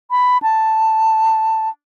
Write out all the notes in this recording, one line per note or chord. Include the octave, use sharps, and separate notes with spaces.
B5
A5